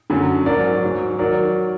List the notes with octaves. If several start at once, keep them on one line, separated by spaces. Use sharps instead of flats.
F#2 D3 F#3
G#2 F#3 A#4 D5
G#2 F#3
D#3 F#3 A#4 D5